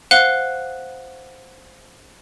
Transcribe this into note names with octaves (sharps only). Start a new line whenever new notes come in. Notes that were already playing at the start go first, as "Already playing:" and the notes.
C5 F5 F#5 F#6 G7